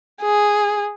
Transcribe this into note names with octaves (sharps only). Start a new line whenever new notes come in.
G#4